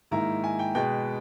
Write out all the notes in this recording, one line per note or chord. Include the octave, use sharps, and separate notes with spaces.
G#2 D#3 A#3 E4 A#5
G#5
G5
B2 G#3 B3 G5